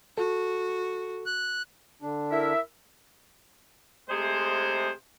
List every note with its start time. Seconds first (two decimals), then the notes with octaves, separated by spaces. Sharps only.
0.18 F#4 A4
1.26 F#6
2.02 D3 D4
2.30 E4 A#4 E5
4.10 C3 G#3 A3 G#4 C5